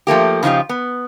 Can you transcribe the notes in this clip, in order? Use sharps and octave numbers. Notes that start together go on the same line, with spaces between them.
F3 A3 A#3 G4
C#3 F3 D#4 F4 G4
B3